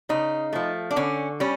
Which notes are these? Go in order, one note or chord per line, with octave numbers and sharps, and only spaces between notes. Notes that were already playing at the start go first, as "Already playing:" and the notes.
C#3 D#4
F3 A3
D4
D3 C#4
G3 C#4